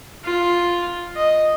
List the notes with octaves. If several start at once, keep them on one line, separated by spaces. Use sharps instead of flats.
F4
D#5